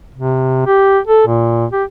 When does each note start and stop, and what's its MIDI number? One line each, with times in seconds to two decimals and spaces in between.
0.15 0.66 48
0.66 0.99 67
1.07 1.25 69
1.27 1.66 46
1.72 1.84 67